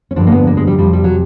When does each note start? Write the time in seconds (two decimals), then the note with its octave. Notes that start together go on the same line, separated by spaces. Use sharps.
0.11 C#4
0.16 G2 D3 F3 D4
0.27 A#3
0.32 B3
0.47 A#3
0.57 G#3
0.67 G3
0.78 F2 C3 F3 G3
0.93 G3
1.04 F#3